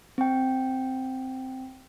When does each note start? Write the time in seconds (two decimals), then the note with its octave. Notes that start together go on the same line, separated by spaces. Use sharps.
0.18 C4 G5